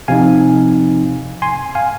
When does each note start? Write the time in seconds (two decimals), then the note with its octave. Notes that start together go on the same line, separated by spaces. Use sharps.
0.08 C3 F3 C4 D#4 F5 G#5
1.42 G#5 C6
1.75 F5 G#5